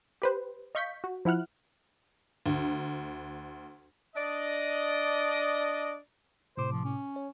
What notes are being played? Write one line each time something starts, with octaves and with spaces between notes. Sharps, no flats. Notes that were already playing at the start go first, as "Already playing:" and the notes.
G4 B4 C5
D#5 F5 C#6 G6 B6
F#4
F3 E4 F#5 F6 F#6
D2
D4 D5 D#5
A2 C3 C5 D6
F3
C#4
C#5